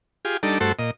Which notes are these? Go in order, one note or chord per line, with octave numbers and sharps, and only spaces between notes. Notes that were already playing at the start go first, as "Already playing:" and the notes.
F4 G4 G#4
G3 D4 D#4 A4
G2 A3 F#4 A4 C5
A#2 D#5